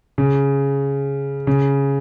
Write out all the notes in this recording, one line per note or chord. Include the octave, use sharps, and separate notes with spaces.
C#3
C#3